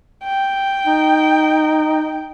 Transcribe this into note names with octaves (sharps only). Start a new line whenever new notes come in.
G5
D#4